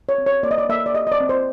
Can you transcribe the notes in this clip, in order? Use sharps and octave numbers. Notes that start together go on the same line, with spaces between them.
C#5
C4
C#5
A#3 D5
D#5
D5
A#3 E5
D5
G4 D#5
D#5
D5
C4
C5